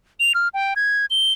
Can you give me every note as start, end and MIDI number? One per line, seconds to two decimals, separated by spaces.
0.20 0.33 101
0.35 0.48 89
0.54 0.74 79
0.76 1.06 92
1.10 1.33 103